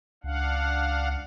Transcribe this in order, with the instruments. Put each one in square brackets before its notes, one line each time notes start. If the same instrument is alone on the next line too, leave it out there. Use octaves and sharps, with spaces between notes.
[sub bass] C#2 [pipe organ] D4 F5 F#5